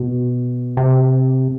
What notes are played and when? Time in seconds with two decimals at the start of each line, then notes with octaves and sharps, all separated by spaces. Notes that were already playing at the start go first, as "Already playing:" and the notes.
Already playing: B2
0.77 C3